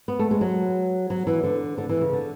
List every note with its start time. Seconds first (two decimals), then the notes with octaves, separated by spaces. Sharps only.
0.08 B3
0.19 A3
0.31 G#3
0.41 F#3
1.10 F#3
1.27 E3
1.43 D3
1.78 D3
1.89 E3
2.01 C#3
2.13 D3